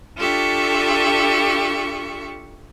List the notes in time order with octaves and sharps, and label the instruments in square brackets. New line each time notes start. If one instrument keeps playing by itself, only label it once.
[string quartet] D4 F4 G4 A4 E5 C#6